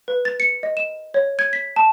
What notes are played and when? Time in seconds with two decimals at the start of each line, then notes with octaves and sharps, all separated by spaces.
0.08 B4
0.25 A6
0.40 C#7
0.63 D#5
0.77 E7
1.14 C#5
1.39 G#6
1.53 B6
1.76 A5